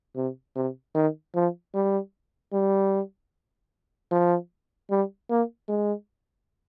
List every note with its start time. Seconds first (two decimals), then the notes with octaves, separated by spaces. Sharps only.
0.16 C3
0.56 C3
0.95 D#3
1.35 F3
1.74 G3
2.53 G3
4.11 F3
4.90 G3
5.30 A#3
5.69 G#3